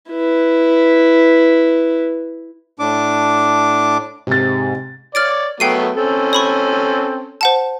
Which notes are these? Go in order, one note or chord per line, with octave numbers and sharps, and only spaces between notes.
E4 B4
A2 D4 D6
G#2 C3 A6
C#5 D5 F6 A6 D7
F#3 A3 B3 G5 C7 D#7
C4 C#4 A4
C#5 B5 C#6
C5 F#5 A5